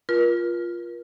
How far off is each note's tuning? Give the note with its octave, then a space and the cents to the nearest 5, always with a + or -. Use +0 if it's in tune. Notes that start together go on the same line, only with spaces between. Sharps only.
F4 +0 A#4 +40